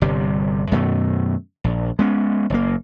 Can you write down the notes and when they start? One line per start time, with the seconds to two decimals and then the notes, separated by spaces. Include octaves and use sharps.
0.02 G1 C3 G3
0.72 F#2 B2 D#3 A3
1.64 A#1
1.99 G#3 B3 C#4
2.50 F#1 A#3